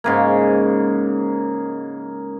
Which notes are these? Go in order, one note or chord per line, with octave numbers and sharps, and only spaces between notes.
G#2 C#3 A#3